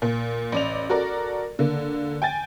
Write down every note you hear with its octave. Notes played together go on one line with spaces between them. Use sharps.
A#2
A1 D5 F7
F#4 A4 A#4 D5
D3 A#3
G5 G#5 A6